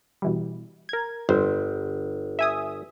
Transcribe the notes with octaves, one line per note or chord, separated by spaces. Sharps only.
B2 E3 G3
A#4 G#6
G1 F2 G3 C5
E5 G#5 D#6